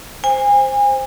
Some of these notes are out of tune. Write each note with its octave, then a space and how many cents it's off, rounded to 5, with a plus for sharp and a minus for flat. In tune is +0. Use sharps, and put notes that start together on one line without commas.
C5 +0 G#5 -30